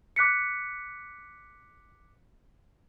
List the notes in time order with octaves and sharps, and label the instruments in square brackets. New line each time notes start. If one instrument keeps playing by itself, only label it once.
[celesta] D6 F#6 B6 C#7